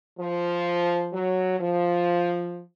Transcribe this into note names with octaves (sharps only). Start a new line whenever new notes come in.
F3
F#3
F3